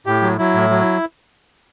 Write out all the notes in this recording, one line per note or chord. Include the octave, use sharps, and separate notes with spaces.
A2 G4
F#3
F#3 E4
A2
F#3